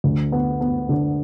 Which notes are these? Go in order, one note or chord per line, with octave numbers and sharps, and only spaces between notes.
D2
B3
B3
D3